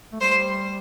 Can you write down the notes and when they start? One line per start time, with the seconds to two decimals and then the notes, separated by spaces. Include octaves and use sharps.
0.13 A3
0.21 G3 C5